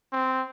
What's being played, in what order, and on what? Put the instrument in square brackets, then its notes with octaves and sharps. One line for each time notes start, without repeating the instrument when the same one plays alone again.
[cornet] C4